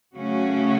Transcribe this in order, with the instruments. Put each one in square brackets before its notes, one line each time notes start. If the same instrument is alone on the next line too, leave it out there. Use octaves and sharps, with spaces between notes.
[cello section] C#3 F#3 A3 C#4 F#4